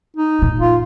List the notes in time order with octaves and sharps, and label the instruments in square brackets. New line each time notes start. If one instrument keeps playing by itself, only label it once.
[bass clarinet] D#4
[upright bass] A#2
[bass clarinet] F4